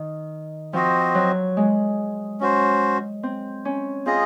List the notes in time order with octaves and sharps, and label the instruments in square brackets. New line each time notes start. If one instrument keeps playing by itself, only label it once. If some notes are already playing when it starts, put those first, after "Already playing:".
Already playing: [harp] D#3
[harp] F3 [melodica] C4 F#4 C5 D#5
[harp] F#3
G#3
[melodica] C#4 F#4 C5
[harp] C4
C#4
[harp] C4 [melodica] F4 G#4 D#5